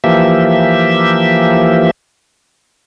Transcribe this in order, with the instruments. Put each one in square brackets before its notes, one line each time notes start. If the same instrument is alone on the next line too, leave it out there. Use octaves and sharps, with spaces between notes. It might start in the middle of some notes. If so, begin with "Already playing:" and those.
[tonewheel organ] E3 F3 A#3 G4 E5